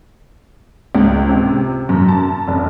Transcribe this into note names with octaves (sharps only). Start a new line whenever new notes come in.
C#2
C3
F#2
A5
F1